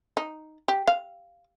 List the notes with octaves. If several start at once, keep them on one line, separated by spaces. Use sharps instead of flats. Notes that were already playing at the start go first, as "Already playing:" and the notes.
D#4
G4
F5